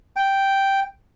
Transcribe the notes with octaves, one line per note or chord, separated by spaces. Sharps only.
G5